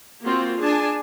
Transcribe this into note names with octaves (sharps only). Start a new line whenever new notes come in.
A#3 C4 F4 F#4 C5
D4 G#4 G#5 A5